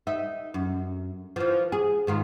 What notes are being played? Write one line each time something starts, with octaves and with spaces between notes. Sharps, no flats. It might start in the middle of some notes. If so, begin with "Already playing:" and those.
D#4 E5
F#2
E3 F3
G#4
G#2 D#3 F4